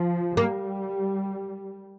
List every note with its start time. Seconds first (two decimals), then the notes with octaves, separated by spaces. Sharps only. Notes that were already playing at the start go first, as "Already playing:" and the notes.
Already playing: F3
0.37 G3 A#3